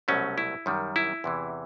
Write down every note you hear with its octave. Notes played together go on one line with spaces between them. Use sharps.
C2 B2 F#3 A3 C#4
E4
F#2 D#3 G3
E4
E2 C3 E3